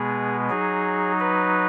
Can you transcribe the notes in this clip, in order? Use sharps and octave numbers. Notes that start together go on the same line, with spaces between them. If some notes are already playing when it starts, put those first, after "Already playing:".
Already playing: B2 G#3 B3 G#4
F#3 D#4 G#4
B4